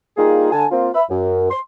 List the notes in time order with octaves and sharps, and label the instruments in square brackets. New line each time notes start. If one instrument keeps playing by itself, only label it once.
[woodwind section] G3 A#3 D#4 F4 G#4
D3 G#5 A5
A#3 C4 F4
E5 B5
F#2
C6